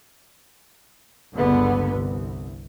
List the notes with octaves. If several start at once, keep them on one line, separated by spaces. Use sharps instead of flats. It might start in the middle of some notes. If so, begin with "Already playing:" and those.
G1 C#2 D3 B3
C2